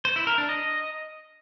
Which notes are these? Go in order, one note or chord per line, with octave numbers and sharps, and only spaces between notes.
C5
E4
A#4
D4
D#5